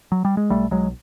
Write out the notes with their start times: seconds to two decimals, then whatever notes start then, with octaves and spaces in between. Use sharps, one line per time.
0.12 F#3
0.25 G3
0.37 G#3
0.50 B1 G3 A3
0.71 B1 F#3 G#3